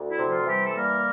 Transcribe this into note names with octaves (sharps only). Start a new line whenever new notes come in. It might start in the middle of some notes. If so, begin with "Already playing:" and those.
Already playing: D2
E4
C3
F3 F4
E3 G3 G4
A4
G3 A#3 A#4